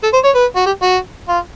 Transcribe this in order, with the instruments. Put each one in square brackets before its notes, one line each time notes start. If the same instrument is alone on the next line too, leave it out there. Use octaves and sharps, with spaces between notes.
[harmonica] A4
C5
C#5
B4
F#4
G4
F#4
F4